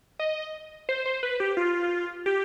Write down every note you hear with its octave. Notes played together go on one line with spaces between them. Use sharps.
D#5
C5
C5
B4
G4
F4
G4